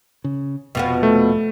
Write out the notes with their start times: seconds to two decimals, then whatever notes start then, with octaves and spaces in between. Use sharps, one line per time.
0.24 C#3
0.75 F1 B2 F3 B3
1.03 A3